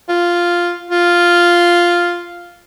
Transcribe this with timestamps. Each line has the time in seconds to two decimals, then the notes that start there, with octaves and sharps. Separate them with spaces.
0.09 F4
0.91 F4